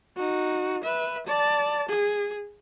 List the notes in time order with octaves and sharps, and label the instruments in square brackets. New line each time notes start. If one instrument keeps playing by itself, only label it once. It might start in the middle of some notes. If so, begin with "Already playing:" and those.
[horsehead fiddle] D#4 F#4
B4 E5
D5 A5
G#4